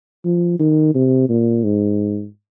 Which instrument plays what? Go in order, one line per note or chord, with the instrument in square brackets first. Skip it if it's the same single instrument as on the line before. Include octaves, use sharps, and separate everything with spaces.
[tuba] F3
D#3
C3
A#2
G#2